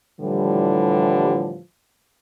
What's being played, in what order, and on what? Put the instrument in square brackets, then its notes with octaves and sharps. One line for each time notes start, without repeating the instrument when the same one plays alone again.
[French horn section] A2 D3 E3 F3 G3